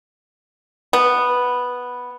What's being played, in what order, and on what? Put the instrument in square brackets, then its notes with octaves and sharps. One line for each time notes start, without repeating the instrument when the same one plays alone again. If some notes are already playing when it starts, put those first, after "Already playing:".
[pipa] B3